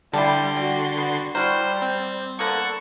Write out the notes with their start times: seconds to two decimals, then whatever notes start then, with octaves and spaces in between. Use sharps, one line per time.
0.14 D3 G3 E4 G4 A5 C6
0.57 F#4 G4
0.97 B3 F#4
1.35 G3 E4 F#4 A#4 C5
1.82 C4
2.39 D3 A#3 B3 A4 F#5 C#6